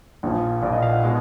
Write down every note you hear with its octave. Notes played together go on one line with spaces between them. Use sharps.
A#1 A#2 F3
A#1 A#2 F3 D5
D#5
F5
F#5
B2 G#3